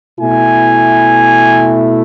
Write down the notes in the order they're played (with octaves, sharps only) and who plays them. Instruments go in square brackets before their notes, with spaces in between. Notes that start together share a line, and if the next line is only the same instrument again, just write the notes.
[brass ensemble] B2 A3 E4 G#5